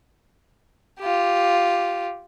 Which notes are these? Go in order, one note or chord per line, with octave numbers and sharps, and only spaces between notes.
F4 G4